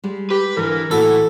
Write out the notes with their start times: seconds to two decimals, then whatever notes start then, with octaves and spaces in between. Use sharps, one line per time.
0.04 G3 G#3
0.30 G4 B4
0.57 G#2 D3 E3 A#4
0.91 A2 E3 A#3 E4 F#4 A4